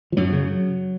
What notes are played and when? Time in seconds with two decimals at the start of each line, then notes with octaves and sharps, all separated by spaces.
0.12 F3
0.17 F#2 F#3
0.32 C#3